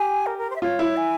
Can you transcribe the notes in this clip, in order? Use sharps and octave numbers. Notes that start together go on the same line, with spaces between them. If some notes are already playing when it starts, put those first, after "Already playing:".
Already playing: G4 G#5
A#4
A#4
C5
E5
F4 C#5
E4
G#5